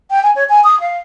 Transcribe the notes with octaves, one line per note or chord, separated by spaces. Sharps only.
G5
G#5
C#5
G#5
D#6
F5